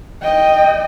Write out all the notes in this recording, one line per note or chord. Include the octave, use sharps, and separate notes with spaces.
D#5 G5